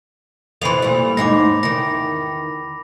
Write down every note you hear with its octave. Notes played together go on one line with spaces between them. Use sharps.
F2 E3 B5 C7 F7
A#2 G3
D#2 G#2 D#4 D6 A#6
E2 D#3 A#6